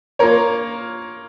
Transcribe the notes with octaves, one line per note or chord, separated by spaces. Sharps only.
A#3 F4 A#4 C#5